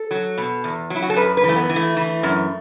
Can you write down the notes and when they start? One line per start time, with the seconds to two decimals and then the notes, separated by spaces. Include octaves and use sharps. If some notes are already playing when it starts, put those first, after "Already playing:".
Already playing: A4
0.11 F#3
0.38 B2
0.64 E2
0.90 F#3
0.96 E4
1.02 F#4
1.10 A4
1.16 F#2 B4
1.37 B4
1.44 E3
1.49 A3
1.56 B3
1.69 E3
1.76 A3
1.97 E3
2.23 F#2